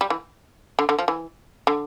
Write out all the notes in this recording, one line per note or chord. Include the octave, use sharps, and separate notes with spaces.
G3
E3
D3
D3
F3
E3
D3